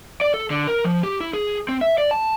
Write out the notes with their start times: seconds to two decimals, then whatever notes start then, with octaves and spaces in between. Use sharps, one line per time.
0.21 D5
0.34 A4
0.50 D3
0.67 A#4
0.85 F3
1.03 G4
1.21 E4
1.33 G#4
1.69 C4
1.81 E5
1.98 D5
2.11 A5